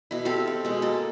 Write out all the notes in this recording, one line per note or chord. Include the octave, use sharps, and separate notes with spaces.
B2 E4
C4 G4 A4 F5
C4
B2 G#3
A#3 A4